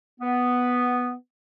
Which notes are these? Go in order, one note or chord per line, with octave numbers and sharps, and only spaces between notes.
B3